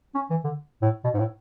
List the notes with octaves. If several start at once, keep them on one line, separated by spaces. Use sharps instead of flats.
C#4
E3
D3
A2
B2
G#2
A2